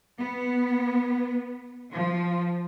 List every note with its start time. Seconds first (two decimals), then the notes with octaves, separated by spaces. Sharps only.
0.18 B3
1.93 F3